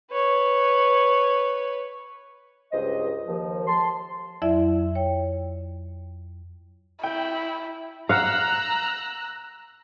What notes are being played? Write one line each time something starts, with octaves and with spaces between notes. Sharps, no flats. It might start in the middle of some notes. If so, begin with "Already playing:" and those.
B4 C#5
C#2 G2 C5 D#5
D#2 F3
A5 C6
F2 F#3 E4 D5 E5
C#5 G5
E4 G5
F5 F#5 A#5 E6 F#6